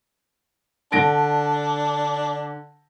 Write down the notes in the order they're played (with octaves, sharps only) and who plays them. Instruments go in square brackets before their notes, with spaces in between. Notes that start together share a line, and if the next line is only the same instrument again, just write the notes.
[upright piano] D3 A#6 D7 [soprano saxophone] D4